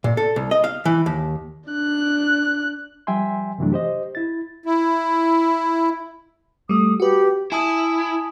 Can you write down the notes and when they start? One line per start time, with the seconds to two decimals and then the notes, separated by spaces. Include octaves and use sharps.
0.04 A#2
0.17 A4
0.36 C2
0.51 D#5
0.64 F5
0.85 E3
1.06 D#2
1.70 D4 F#6
3.07 F3 G3 E5 G5 G#5 C6
3.58 F#2 C3 E3 F#3 A3 D4
3.72 G4 C5 D#5
4.15 E4 A6
4.66 E4
6.69 G3 A3 D#6
7.00 F#4 G4 B4
7.52 E4 G#5 A5 D#6